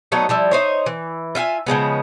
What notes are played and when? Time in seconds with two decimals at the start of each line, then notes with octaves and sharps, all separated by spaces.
0.12 F#3 A3 B3 D#4
0.29 F3 G3 E4
0.51 D#4 C5 C#5
0.86 E3
1.35 F4 E5 F5 G#5
1.66 C#3 F3 G#3 B3